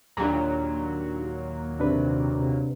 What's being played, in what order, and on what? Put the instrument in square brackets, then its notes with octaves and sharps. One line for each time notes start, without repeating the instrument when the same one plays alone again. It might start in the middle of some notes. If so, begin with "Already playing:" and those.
[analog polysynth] D#2 A#2 F#3 [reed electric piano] D4 G4 A#5
[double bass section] C3 [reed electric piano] D4 B4